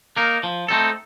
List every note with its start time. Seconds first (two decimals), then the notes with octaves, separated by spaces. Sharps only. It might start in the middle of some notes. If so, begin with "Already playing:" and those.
0.16 A#3 D#4 A#4
0.43 F3
0.68 A3 C4 D#4 A4